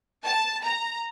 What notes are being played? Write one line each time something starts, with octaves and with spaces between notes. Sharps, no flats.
A5
A#5